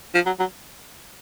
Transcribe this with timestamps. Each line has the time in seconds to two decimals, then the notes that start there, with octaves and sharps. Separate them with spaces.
0.15 F3
0.26 F#3
0.39 F#3